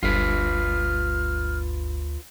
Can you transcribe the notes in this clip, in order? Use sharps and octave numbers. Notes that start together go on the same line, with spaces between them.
G1 D2 F4 B4 F6